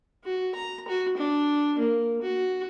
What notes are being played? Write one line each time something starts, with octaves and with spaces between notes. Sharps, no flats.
F#4
A#5
F#4
D4
A#3
F#4